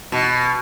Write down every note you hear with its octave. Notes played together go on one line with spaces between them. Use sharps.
B2